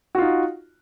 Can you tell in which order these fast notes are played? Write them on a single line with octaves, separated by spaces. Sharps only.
F#4 F4 D#4